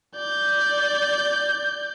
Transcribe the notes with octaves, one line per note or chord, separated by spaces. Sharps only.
D5 G6